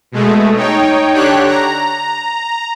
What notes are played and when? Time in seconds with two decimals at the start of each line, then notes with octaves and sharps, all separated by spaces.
0.12 B2 G#3 A3
0.55 D#4 C#5 G5
1.14 D3 D4 G4 C#5 F#6
1.46 A#5